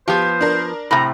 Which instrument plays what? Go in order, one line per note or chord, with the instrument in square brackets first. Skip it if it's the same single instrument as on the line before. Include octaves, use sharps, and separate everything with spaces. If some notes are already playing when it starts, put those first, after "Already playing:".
[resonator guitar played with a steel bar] F3 B3 [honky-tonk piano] G4 [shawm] C5
[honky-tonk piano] D4 A#4
[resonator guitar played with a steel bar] A2 C3 [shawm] A#5 [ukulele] B5